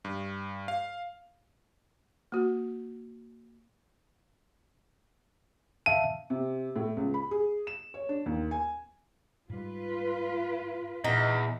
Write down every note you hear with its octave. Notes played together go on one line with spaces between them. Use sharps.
G2
F5
A#3 F#4
E5 F5 A5 D#7
C3
A2
C#2
B5
G#4
E7
C#5
D4
D#2
G#5
G#2 G3 F4 B4
E2 A#2 D#4